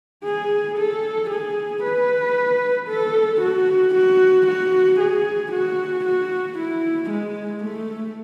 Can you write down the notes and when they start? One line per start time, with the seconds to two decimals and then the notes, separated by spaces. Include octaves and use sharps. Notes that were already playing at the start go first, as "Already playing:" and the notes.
0.25 G#4
0.78 A4
1.30 G#4
1.83 B4
2.89 A4
3.42 F#4
3.95 F#4
4.47 F#4
5.00 G#4
5.53 F#4
6.05 F#4
6.59 E4
7.11 G#3
7.64 A3